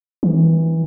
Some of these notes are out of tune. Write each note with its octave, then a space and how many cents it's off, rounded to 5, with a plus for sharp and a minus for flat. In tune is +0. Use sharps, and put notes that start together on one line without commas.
E3 -20